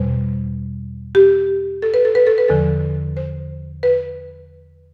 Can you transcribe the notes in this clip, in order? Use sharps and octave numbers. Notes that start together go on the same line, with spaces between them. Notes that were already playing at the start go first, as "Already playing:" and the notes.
Already playing: E2 B2 G3 C5
G4
A4
B4
A4
B4
A4
B4
E2 D3 F3 A4
C5
B4